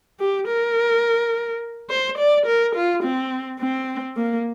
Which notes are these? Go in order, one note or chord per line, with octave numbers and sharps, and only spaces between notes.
G4
A#4
C5
D5
A#4
F4
C4
C4
A#3